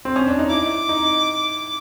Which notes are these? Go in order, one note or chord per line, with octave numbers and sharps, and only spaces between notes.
C4
C#4
D4
D#4
E4 D6
D#4